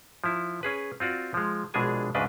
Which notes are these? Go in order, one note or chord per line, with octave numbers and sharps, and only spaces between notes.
F3 E4
C#4 G#4 B4
C4 F4 F#4 D5
F3 G#3
A#1 B2 G#3 D4 G#4 G#5
D2 G#2 C#3 D4 B4 D#5